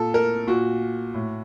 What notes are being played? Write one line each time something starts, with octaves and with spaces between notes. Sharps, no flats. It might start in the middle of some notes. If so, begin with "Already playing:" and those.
Already playing: A#2 A4
A#4
A#2 F#4
A2